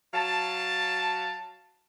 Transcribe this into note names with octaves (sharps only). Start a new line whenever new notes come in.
F#3 F5 A5